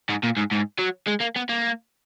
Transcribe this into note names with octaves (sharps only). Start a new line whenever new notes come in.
G#2
A#2
G#2
G#2
F#3
G#3
A#3
B3
A#3